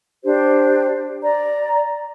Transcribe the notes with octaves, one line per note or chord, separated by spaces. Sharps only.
D4 G4 C5
D5 A#5